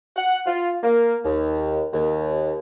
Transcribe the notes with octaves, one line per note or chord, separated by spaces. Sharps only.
F#5
F4
A#3
D#2
D#2